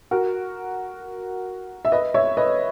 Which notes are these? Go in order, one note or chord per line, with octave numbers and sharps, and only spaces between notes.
F#4 A#4
E5
B4 D#5
C#5 E5
B4 D#5